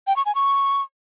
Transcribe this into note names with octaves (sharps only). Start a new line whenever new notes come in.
G5
C#6
G#5
C#6